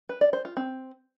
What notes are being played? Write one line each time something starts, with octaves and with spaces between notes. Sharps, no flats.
B4
D5
C5
F4
C4